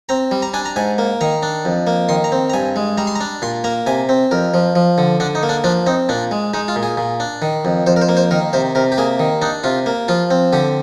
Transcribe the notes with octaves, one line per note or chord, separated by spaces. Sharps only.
C4 A#5
G3
A#5
D4 G#5
A#5
G#2 G#5
A#3
D#3 A#5
D4
F2
A#3
D#3 C6
A#5
C4
A#5
G2 G#5
G#3
G3 A#5
C6
A#5
D4
A#2 C6
A#3 A#5
C3 G#5
C4
F2 A#4
F3
F3
D3
D3 D4
D#4
A#3
D4
F3 D4
C4 D#4
A#2 D4
G#3
G#3 D#4
F4
A#2
G#4
A#2
D4
D#3
F2
F2 C5
A#4
C5
A#3
C5
D#3 A#4
C3 C5
C3 A#4
G4
A#3 G#4
D#3
D4 D#4
C3 F4
A#3
F3 F4
C4
D3 G4